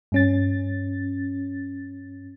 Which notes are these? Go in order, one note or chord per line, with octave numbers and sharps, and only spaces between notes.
G2 C#4 A6